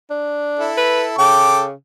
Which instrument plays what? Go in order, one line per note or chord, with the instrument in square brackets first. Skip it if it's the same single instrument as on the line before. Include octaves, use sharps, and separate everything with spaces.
[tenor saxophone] D4
[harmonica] E4 A4
[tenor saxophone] B4
[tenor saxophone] C#3 [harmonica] A4 G5 D6